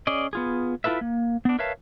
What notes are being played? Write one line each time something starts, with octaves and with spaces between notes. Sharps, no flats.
C#4 G#4 D5 D#5
B3 F4 G#4
E4 F4 A4 B4 E5
A#3
B3 D4
A#4 B4 C#5 E5 F5 A5